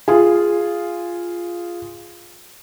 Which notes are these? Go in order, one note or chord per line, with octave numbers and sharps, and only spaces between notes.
F4 G#4